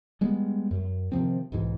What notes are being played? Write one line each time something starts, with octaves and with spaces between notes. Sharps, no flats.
G3 G#3 B3
F#2
C3 D#3 F3 C4
B1 G#2 E3